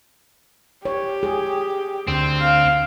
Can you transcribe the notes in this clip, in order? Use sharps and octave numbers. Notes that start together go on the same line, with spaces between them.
G4 C#5
G#4
D2 C4
F5